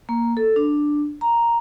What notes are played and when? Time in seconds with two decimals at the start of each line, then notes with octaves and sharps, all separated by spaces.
0.09 A#3
0.37 A4
0.56 D4
1.21 A#5